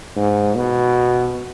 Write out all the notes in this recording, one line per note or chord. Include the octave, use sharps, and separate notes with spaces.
G#2
B2